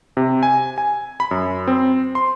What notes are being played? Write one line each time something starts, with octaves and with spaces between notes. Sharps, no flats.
C3
G#5
G#5
B5
F#2
C4
C6